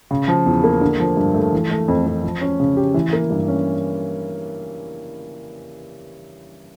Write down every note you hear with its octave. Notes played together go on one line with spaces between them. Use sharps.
C#3
F3
E2
A#3
D3
F3
G2
A3
E3
A3
F2
F2
F3
C#4
C#3
G4
E3
A#3
G2
C#4